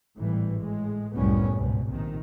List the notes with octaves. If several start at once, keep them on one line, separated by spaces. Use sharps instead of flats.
G#1 A2 E3 G3
A2 G#3
C2 F#2 A2 G3 B3 C#4
C#2 G#2 B2
A#1 C3 D#3